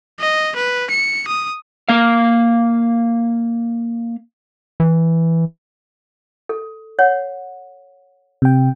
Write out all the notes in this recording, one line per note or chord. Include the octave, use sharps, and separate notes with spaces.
D#5
B4
C#7
D#6
A#3 F5
E3
A4
C#5 F#5
C3 G5